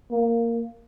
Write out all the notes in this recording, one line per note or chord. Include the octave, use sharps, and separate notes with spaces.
A#3